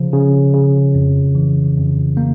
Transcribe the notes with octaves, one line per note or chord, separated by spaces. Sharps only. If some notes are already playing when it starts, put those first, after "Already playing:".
Already playing: C#3 F3
C#3
C#3
F2
E3
F2
A#3